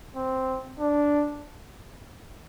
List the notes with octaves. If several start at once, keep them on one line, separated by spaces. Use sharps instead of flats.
C4
D4